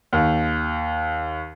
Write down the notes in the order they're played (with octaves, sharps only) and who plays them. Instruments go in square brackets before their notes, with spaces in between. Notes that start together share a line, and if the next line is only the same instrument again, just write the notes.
[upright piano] D#2